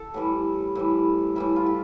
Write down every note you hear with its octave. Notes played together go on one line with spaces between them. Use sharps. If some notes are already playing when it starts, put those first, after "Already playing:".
Already playing: A4
A2 E3 G3 G4
A2 E3 G3
A2 E3 G3 E4
F4
G4